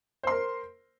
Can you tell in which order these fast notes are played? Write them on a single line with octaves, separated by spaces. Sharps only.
C5 C6 A#4